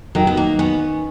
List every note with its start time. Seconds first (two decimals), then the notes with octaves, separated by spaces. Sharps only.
0.15 D#3 F#3
0.27 B3
0.37 A#3
0.59 B3 C#4